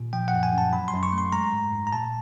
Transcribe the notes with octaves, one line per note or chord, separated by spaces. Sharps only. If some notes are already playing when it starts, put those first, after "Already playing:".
Already playing: A#2
F3 G5
F#5
F#2
G#5
F#2 A5
F#3 B5
C6
F#2
C#6
A3
C6
G#3 A#5
G#2
G#2
A#5
A#2 A5